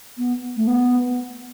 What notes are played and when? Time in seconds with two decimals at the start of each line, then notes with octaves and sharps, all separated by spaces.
0.17 B3
0.56 A3
0.67 B3